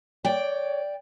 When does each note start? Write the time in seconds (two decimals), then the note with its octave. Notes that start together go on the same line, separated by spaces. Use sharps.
0.25 C#5 D5 G5